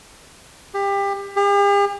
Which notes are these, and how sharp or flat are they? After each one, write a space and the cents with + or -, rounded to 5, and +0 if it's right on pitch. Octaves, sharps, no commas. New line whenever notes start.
G4 +25
G4 +45